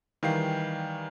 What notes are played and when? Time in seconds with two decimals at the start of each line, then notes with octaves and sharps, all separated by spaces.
0.23 D#3 E3 G3 F5 G5 C7